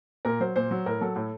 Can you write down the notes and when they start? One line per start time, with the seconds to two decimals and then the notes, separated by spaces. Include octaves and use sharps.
0.25 A#2 A#4
0.40 F#3 C5
0.56 A#2 C5
0.71 F#3
0.86 A2 A#4
1.01 F#3 A4
1.16 A2